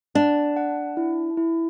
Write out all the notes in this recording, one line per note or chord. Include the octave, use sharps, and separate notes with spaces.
D4 F#5
F#5
E4
E4